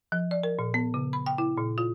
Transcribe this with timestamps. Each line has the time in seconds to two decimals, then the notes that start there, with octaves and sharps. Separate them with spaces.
0.12 F3
0.31 D5
0.43 A#4
0.59 A#2
0.74 B3
0.94 C#3
1.13 B5
1.26 G5
1.38 E4
1.57 A#2
1.78 F4